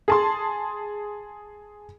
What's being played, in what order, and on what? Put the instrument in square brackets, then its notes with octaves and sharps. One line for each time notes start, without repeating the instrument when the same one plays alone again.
[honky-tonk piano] G#4 A5 C6